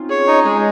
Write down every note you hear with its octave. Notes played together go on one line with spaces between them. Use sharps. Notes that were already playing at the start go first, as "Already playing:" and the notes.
Already playing: C4 C#4 D#4 F4
G#4 C#5
D#4
G#3 G#4